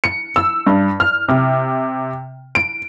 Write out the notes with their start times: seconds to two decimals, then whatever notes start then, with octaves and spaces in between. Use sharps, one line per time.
0.04 C#7
0.36 E6
0.67 G2
1.00 F6
1.29 C3
2.55 D7